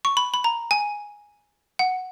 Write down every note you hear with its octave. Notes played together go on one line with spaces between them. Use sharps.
C#6
B5
B5
A#5
G#5
F#5